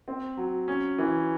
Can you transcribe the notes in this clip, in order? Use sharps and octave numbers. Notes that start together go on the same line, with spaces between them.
C4
F#3
C#4
E3